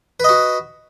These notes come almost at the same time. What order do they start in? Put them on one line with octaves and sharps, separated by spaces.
B4 D#5 F#4